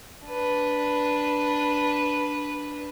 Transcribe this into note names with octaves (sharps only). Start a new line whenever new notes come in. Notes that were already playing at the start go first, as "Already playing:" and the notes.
D4 B4